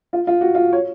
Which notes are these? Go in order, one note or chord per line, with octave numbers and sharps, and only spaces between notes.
F4
F4
F#4
F4
C#5